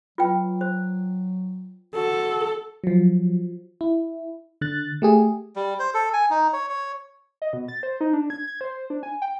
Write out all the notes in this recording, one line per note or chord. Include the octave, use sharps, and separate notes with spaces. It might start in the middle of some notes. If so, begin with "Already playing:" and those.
F#3 F4 B4 G5
C5
F#4 A4
F3 F#3
E4
D3 F#6 A6
A3 G4 G#4
G3
C5
A4
G#5
D#4
C#5
C#5
D#5
B2
A6
C5
D#4
D4
G#6
G#6
C5
D4
G#5
G5